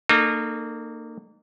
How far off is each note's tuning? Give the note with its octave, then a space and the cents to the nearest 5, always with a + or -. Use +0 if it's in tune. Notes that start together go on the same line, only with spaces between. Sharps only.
A#3 -20 D#4 -40 A4 +0